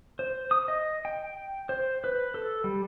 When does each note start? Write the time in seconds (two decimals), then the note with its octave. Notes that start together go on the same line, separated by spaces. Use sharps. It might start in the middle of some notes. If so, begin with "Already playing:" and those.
0.19 C5
0.51 D#6
0.68 D#5
1.05 G5
1.69 C5
2.04 B4
2.34 A4
2.64 G3